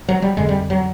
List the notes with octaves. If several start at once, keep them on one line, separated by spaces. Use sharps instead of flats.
F#3
G3
F2 D3 G#3
G3
F#3